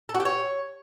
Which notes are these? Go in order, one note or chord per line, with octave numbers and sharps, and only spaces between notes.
A4
F#4
G4
C#5